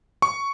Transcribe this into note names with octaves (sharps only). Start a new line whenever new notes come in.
C#6